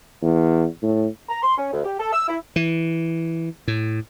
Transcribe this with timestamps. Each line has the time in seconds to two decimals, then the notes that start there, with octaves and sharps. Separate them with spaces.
0.22 E2
0.82 A2
1.29 A#5
1.42 C6
1.57 C#4
1.72 D2
1.84 G4
1.99 A4
2.13 E6
2.28 E4
2.56 E3
3.68 A2